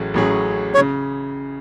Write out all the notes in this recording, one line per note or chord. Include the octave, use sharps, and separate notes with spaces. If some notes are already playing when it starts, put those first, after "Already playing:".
Already playing: A1 A2 F#3 C#4 G#4
A1 A2 F#3 C#4 G#4
C#5
C#3